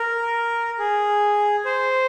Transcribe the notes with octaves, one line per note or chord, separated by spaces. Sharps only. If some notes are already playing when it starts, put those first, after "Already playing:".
Already playing: A#4
G#4
C5